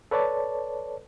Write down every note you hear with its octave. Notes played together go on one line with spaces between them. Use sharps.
A4 B4 C#5 D5 A5